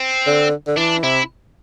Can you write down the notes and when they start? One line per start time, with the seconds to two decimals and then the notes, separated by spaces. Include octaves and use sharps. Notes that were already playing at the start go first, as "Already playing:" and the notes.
Already playing: C4
0.26 D3
0.67 D3
0.77 E3 D4
1.03 C3 E4